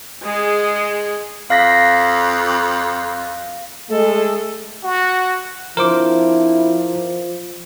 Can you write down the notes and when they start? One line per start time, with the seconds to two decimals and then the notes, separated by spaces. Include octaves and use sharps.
0.23 G#3 G#4
1.50 F2 F5 A#6 B6
3.90 G#3 A3 A4
4.83 F#4
5.77 F3 C4 D4 E4 A#4 C5 D6